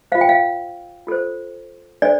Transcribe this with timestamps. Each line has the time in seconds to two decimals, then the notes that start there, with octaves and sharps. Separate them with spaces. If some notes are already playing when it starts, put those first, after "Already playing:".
0.12 F4 C5 F5
0.21 G5
0.29 F5
1.07 F4 A4 C5
2.02 D4 A4 C5 D5